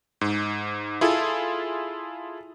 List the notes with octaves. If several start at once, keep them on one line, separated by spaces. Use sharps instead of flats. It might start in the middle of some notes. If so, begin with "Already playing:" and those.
G#2
E4 F4 G#4 A4